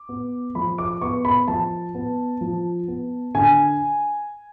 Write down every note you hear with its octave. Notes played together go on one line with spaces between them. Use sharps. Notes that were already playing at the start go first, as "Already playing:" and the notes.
Already playing: D6
B3
F3 B5
D6
B3 C#6
B5
F3 A5
B3
F3
B3
D3 G#5